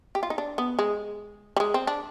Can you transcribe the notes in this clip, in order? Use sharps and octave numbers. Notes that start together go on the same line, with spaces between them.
G4
F4
D#4
D4
B3
G#3
G3
G#3
C4
D4